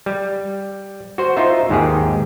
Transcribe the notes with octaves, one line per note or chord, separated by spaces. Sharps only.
G3
F#4 C5
D#4 F4 C5 E5
D#2 G#2 D#3 G4 G#4